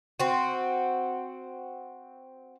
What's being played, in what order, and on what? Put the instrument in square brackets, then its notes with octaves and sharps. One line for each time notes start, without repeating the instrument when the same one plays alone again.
[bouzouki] C4 F#4